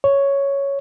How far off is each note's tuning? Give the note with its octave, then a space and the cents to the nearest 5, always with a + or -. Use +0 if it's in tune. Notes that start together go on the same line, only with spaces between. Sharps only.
C#5 +5